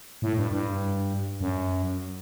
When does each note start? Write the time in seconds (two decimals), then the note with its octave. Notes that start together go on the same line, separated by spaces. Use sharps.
0.22 A2
0.37 G2
0.51 G2
1.41 F#2